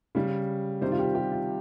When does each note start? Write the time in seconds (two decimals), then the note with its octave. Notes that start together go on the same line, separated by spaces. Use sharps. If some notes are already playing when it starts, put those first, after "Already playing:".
0.15 C#3 G3
0.81 C3 D#3 G3 C5
0.92 F4
0.99 G4
1.15 G4
1.31 F4